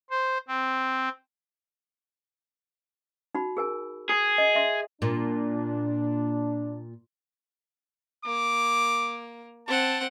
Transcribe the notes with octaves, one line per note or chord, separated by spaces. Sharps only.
C5
C4
D#4 F#4 B5
G#4 A#4 G#5
G#4
D#5
E5 C6
A#2 D4
A#3 D6
C4 F#5 A5